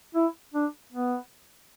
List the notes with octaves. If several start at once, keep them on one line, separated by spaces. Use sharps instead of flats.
E4
D4
B3